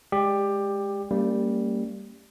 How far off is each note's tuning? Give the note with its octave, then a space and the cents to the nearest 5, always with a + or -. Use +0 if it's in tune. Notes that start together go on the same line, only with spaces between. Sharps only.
G#3 +0 G4 +15 D5 +0
G3 +0 A#3 -30 C#4 +0